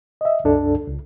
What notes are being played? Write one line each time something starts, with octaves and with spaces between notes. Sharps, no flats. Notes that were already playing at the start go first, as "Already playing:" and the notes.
D#5 E5
C2 F#2 D4 A4
C#2